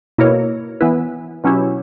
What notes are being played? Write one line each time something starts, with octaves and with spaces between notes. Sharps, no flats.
B2 A#3 E4 A#4 C#5
E3 B3 E4 B4
B2 F#3 C#4 E4 G4